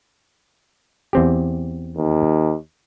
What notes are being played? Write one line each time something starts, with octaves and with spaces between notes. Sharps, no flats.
E2 C4 G4
D#2